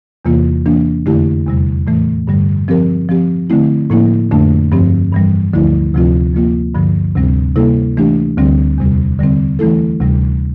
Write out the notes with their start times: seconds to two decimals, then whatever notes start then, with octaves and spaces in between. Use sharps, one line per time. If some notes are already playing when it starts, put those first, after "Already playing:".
0.25 E2 C3 E3 A#3 F4
0.66 E3 A#3 D4
1.06 F2 D3 A3 E4 G4
1.46 E2 C3 G3
1.87 A2 E3 A3
2.27 G2 D3 G3
2.68 F3 C4 G4 A#4
3.09 F3 C4 G4
3.50 D3 A3 C4 E4
3.90 A2 F3 A#3 E4
4.31 F2 D3 A3 D4
4.71 G2 F3 C4 G4
5.12 G2 E3 G3
5.53 D2 D3 F3 A3 E4
5.94 D2 C3 F3 C4 F4
6.34 F3 A#3 F4
6.75 G2 D3 F3
7.15 D2 C3 G3 C4
7.56 C3 G3 A#3 E4 A4
7.97 E3 A3 D4 G4
8.38 D2 D3 G3 C4
8.78 E2 C3 G3
9.19 D3 G3 C4
9.59 E3 A3 E4 A4
10.00 D2 C3 G3